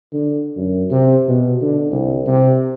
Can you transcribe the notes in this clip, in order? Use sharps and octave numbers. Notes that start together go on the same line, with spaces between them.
D3
F#2
C3
B2
D3
C2
C3